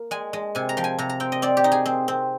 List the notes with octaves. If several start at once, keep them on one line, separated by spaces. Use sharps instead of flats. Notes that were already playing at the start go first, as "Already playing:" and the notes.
Already playing: A#3
G#3 G#5
G#3
C3 G#5
A#5
F3 G5
G#5
C3 A#5
A#5
C4 G5
D#5
C4 D5
G4
D#4
G#4
C4
C4